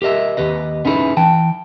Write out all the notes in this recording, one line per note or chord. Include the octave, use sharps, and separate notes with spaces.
G4 A#4 D#5 E5
D#2 G4 B4 D#5
B3 C#4 D#4 E4 G#4 B4
E3 G5 A5